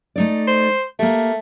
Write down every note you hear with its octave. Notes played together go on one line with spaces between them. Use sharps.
A3 D#4 D5
C5
A3 A#3 G4